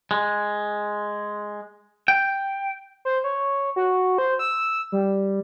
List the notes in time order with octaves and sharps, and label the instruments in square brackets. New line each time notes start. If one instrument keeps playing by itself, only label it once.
[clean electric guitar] G#3
G5
[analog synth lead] C5
C#5
F#4
C5
E6
G3